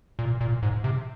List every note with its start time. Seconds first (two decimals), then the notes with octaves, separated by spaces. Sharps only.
0.19 A#2
0.41 A#2
0.63 G#2
0.84 C3